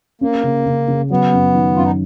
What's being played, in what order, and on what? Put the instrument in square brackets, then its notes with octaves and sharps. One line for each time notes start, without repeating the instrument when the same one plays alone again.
[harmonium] A#3 [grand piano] C#4
[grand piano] C#3
C#3
C#3
[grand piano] F#3 [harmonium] B3
[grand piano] F#2
D#3
[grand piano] F#2 [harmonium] F4
[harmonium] D#4